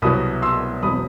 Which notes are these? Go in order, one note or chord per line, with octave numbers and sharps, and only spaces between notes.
C2 B2 F#3 B3 B5 D#6
C6 E6
E1 B2 F#3 C4 B5 D#6